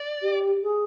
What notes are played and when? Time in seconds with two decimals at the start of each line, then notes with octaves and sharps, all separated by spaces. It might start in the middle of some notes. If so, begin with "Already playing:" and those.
Already playing: D5
0.22 G4
0.63 G#4